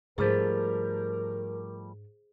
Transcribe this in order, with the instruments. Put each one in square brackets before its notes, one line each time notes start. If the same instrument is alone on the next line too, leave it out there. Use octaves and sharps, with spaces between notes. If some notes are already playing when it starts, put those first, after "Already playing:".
[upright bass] G#2 D4 [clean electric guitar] F3 G3 A3 [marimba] G#4 C5 [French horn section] A#4